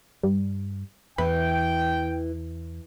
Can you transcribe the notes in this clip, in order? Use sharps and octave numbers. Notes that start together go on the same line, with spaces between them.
G2 G3
E2 E3 B4 G5